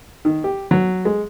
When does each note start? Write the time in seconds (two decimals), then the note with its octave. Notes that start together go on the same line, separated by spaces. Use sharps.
0.25 D#3
0.44 G4
0.71 F#3
1.05 G#3